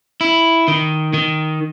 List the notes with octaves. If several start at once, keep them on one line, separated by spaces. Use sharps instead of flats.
E4
D#3
D#3